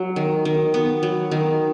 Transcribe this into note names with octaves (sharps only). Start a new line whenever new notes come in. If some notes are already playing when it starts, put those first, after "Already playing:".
Already playing: F#3
D#3
D#3
B3
F#3
D#3